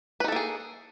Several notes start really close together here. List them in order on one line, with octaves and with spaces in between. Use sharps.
B4 D#4 A4 A#3 G#4